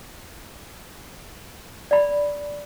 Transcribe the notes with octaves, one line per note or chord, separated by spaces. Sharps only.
D5 B5